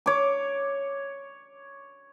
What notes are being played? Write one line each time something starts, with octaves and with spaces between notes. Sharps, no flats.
C#5 D6